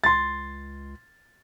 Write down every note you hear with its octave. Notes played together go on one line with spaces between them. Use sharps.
C#2 C6 A6